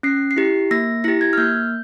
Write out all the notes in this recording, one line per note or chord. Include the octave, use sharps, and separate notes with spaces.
C#4 C7
C7
E4 G4
A#3 A#6
E4 G4 A#6
G#6
F6
A#3 G6